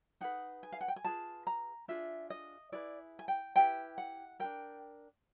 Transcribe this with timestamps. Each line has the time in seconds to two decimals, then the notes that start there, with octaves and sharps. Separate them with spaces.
0.21 D#4 G#4 B4 F#5
0.63 G#5
0.72 F5
0.81 F#5
0.88 G5
0.96 G#5
1.04 F4 G#4 B4 A5
1.47 A#5
1.88 D4 F4 G#4 E5
2.30 D#5
2.72 E4 G#4 B4 D5
3.19 G#5
3.28 G5
3.56 E4 G4 B4 G5
3.98 F#5
4.39 D4 F4 A#4 G5